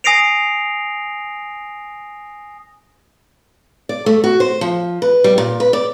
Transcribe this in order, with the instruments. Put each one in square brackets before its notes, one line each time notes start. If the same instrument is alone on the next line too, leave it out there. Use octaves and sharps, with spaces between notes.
[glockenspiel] G#5 D#6 A#6 C7 D7 F7
[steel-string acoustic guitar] D5
A3
F#4
C5
F3
B4
G3
A#2
B4
D5